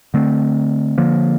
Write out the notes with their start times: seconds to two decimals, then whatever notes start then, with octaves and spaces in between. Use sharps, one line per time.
0.14 D3 A3 C4
0.98 D3 F3 A#3